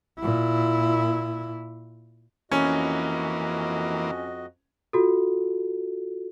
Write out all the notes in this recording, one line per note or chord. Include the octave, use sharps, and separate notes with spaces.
A#2 E4
F2 E3 A#3 C#4 F#4 D#5
F4 F#4 A4